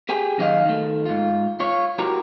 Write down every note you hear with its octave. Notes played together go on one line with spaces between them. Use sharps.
G4 G#4 G5 G#5
F#2 D#3 F4 F#4 D#5 F5
D#3 A3
G#2 F4
F4 C#5
E4 F#4 G4 A#4 A#5